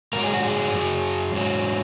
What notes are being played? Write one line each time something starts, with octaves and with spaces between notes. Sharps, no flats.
G#2 F#3 A#4
G#4
F#4
G#4
F#2 F#3
G#2 F#3